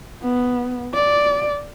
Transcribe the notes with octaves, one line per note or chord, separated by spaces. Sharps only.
B3
D5